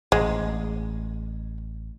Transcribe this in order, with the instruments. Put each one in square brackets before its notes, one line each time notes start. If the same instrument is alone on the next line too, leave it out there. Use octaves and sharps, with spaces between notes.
[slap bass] A1 [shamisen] G#3